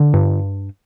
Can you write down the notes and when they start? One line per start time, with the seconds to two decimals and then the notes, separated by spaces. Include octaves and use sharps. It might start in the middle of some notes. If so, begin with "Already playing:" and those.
Already playing: D3
0.14 G2